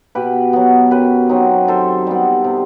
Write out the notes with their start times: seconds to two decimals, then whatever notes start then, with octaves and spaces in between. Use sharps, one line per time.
0.15 B2 G4 B4
0.53 F#3 B3
0.91 F#2 G4 B4
1.29 F#3 C4 D#4
1.68 D#3 A4 C5
2.07 G3 B3
2.44 C3